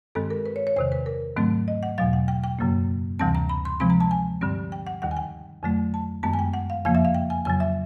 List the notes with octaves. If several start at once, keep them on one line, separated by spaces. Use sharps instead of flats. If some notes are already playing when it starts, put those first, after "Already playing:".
G2 D#3 G#3 C4 A4
A#4
B4
C#5
C#5
E2 C3 D#3 C5
B4
A#4
G#2 D#3 F#3 A3 C4
D#5
F#5
E2 B2 F#3 F5
F#5
G5
G5
F#2 C#3 F#3 A#3
D2 C3 E3 G3 C4 A5
A#5
B5
C6
C3 F3 G#3 C4 B5
A#5
A5
G#5
G2 D3 G3 C4
G5
F#5
D#2 D#3 G3 F#5
G#5
G5
F2 D3 F#3 A3
A5
F#2 D#3 G#3 B3 A5
G#5
G5
F#5
F5
F2 C#3 F3 A#3 F5
E5
F5
G5
G#5
F2 C#3 F#3 G#5
E5